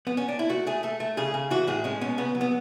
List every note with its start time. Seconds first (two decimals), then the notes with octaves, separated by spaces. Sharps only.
0.07 B3
0.17 C#4
0.29 D4
0.39 E4
0.49 A3 F#4
0.67 A3 G#4
0.83 A3 A4
1.00 A3
1.17 C#3 G#4
1.34 C#3
1.50 E3 F#4
1.67 A2 G#4
1.84 G#3 C#4
2.01 B2 C#4
2.18 C#3 B3
2.35 F#3
2.41 B3